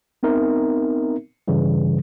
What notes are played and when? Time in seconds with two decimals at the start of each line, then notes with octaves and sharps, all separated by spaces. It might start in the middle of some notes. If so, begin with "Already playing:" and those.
0.23 B3 C4 D#4 A#4 E5
1.48 G2 C#3 E3 G3